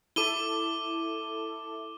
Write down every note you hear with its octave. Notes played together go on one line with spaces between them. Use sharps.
E4 A4 D6 D#7 G7